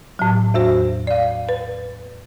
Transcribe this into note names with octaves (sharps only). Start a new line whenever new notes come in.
A2 F#3
E2 F#4 C5
D5 F5
B4